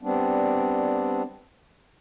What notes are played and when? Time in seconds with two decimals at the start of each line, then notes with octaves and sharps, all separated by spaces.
0.02 G3 B3 C4 D4